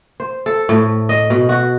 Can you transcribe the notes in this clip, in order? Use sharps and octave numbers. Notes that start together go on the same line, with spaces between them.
C5
A4
A2
D#5
B2
F#4